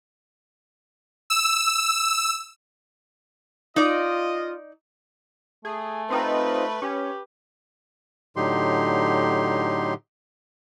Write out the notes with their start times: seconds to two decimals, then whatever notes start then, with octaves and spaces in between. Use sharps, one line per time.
1.30 E6
3.76 D#4 F4 D5 D#5
5.65 A3 G#4
6.10 C4 D#4 F4 B4
6.82 C#4 G4
8.36 A2 D3 F#3 D#4 G4 C6